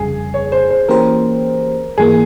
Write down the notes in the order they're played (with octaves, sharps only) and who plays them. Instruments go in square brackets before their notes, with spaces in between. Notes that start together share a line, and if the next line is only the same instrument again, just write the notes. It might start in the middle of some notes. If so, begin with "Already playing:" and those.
Already playing: [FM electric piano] G1 F2 C#3 G3 [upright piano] G#4
[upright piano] C#5
C5
C5
[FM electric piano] E3 A#3 C#4 G4 C5 [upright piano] A#4
[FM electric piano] G#1 G#2 E3 A#3 [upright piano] G#4